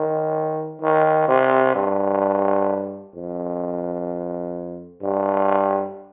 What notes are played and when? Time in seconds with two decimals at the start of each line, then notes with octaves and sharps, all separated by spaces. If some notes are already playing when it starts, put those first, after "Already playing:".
Already playing: D#3
0.81 D#3
1.28 C3
1.75 G2
3.15 F2
5.02 G2